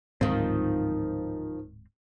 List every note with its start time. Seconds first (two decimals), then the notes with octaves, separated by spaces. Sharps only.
0.21 D1 G#2 D#3 F3 C4